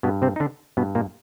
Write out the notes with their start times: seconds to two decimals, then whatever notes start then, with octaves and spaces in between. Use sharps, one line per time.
0.03 G2 B2 B3
0.22 C3 C4
0.36 D#4
0.40 D3 D4
0.77 G2 B2 B3
0.95 A#2 A#3